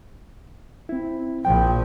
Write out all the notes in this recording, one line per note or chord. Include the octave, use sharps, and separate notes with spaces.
C4 E4
A#1 F3 G5